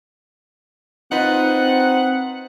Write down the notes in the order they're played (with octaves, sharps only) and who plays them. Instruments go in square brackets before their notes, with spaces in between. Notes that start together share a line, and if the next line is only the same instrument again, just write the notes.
[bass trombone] C4 [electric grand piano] D#4 F4 B4 [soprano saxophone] F#5